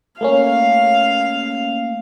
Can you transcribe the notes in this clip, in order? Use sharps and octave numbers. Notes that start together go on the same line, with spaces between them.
A3 A#3 C#4 F5